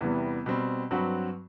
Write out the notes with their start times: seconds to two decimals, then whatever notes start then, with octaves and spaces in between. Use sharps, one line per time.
0.01 E2 C3 E3 G3 B3
0.46 B2 G3 C4
0.91 G2 F#3 C4 F#4 B4